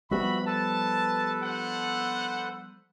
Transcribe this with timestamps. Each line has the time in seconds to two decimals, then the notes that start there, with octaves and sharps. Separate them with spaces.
0.11 F3 G3 B3 F#4 E5 B5
0.47 A4 B4 A5
1.43 D4 C5 F#5